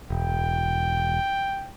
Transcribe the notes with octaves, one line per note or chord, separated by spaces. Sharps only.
E1 G5